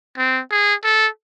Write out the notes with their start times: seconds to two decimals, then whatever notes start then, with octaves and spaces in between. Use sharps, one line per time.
0.17 C4
0.51 G#4
0.84 A4